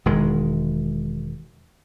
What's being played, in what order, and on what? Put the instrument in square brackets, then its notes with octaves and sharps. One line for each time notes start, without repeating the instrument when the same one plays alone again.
[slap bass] E1 D#3 G#3